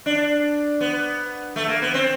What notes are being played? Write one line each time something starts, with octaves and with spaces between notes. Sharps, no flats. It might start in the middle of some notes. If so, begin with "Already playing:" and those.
D4
B3
A3
A#3
B3
C4